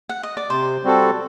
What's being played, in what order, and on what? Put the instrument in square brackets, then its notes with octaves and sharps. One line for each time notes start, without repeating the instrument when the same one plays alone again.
[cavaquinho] F#5
D#5
D5
[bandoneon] C3 [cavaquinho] C5
[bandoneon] G3 C4 F#4 A4